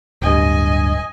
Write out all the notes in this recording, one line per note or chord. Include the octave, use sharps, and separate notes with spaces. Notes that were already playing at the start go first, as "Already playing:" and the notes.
D1 G2 D#5 G#5